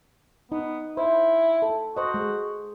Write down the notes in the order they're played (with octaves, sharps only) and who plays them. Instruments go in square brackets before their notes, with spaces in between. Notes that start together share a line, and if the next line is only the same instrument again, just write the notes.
[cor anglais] B3 [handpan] D#4
[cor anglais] E4 [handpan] C5
[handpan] A4
[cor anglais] F#4 [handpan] C5 D#5
[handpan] G#3